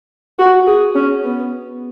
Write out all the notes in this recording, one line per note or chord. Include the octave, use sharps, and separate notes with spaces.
F#4
G#4
C#4
B3